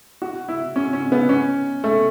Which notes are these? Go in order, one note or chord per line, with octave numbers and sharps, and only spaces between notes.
F#4
E4
C#4
C#4
B3
C#4
A3